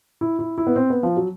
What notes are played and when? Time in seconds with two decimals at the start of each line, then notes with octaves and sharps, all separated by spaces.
0.21 E4
0.39 E4
0.58 E4
0.67 B3
0.76 C4
0.90 B3
1.03 F3
1.17 F#3